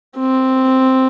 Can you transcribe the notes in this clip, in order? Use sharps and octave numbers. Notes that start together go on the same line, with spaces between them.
C4